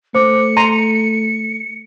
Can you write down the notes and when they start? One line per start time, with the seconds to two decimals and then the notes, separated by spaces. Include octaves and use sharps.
0.15 A3 C5 D6 C#7
0.57 A#5 C6 D#7